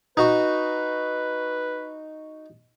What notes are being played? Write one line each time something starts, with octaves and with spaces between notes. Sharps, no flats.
D#4 F#4 B4